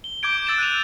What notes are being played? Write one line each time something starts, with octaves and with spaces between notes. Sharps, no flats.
G7
D6 G6 G#6 D7
E6 A6 D7 E7
F#6 D#7 F7